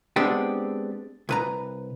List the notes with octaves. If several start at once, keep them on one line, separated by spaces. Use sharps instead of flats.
G#3 B3 C4 D4 G4
C2 B4 A#5